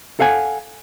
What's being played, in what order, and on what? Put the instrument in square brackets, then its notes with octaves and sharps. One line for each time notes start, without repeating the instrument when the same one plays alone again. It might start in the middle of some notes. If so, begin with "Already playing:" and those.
[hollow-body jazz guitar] A4 F5 F#5 G#5